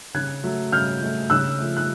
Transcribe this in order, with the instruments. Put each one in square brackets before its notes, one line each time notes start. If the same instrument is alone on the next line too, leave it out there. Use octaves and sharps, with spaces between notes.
[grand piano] C#3 [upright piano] F#6 G#6
[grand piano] F#3 A3
[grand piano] C#3 [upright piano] F6 G6
[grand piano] F#3 A3
[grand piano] C#3 [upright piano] E6 F#6
[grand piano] F3 A3
[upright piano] F#6